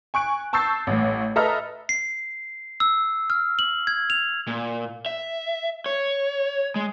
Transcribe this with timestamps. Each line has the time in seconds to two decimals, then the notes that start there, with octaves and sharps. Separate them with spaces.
0.14 G#5 C#6 F#6 D7
0.53 A5 C#6 E6 G6 A6 C7
0.87 A1 A2
1.36 A4 B4 D#5 E5 A#5 F6
1.89 C7
2.80 E6
3.30 F6
3.59 F#7
3.87 G#6
4.10 F7
4.47 A#2
5.06 E5
5.86 C#5
6.76 G#3